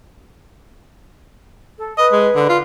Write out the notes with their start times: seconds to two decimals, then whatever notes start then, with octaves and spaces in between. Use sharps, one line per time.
1.78 A4
1.98 B4 D#5
2.12 G#3
2.35 D3
2.49 F4